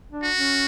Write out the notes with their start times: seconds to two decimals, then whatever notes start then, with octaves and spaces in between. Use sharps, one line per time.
0.11 D4
0.23 F#4
0.36 C#4